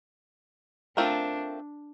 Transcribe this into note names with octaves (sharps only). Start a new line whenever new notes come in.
A3 C4 D4 F4 A#4